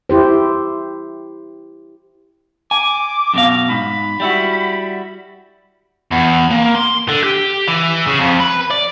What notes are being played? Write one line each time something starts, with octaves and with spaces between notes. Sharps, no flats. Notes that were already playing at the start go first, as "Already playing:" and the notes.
E4 G4 C5
G#5 D6
F#2 B2 F5
G#2 B5
G3 E4 F#4
E2
A#3
C6
D3
G4
E3
C#3
F2
B4
D5